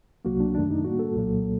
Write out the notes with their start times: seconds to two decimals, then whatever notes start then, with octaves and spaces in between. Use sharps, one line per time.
0.25 C2 C3 F#3 A#3 F#4
0.40 D4
0.55 F#2 D#3 A3 D4
0.71 D#4
0.85 A2 G3 A#3 F#4
0.99 A4
1.15 C2 A#2 F#3 A#3